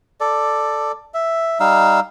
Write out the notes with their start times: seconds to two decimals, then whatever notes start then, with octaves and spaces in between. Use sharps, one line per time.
0.21 A4 D5
1.14 E5
1.60 G3 D#4 F5 E6